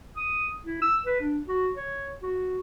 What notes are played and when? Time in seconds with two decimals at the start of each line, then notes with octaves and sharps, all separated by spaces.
0.16 D#6
0.66 E4
0.82 E6
1.06 B4
1.20 D4
1.47 F#4
1.75 C#5
2.22 F#4